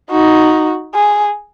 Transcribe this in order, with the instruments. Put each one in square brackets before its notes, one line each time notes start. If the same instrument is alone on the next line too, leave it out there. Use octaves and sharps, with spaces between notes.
[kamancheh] D#4 [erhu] F#4
[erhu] G#4